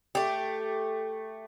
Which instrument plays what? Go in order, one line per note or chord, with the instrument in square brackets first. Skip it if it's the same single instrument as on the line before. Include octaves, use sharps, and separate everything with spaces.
[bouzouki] A3 G4